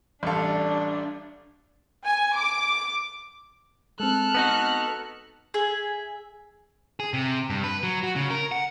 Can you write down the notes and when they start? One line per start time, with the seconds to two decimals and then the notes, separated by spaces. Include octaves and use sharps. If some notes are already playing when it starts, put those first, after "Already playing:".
0.23 A1 G3 D4 A4 F5
2.04 G#5
2.36 D6
4.00 G#3 C4 A4 F6 F#6
4.35 B3 D#4 F#4
5.54 G#4 E5
7.00 G#4
7.13 C3
7.50 G2
7.64 B4
7.83 F#3
8.03 F#4
8.16 C#3
8.30 A#4
8.52 F#5